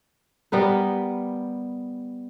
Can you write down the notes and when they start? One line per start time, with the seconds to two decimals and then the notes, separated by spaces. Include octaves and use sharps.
0.52 G3 B3 A#4 B4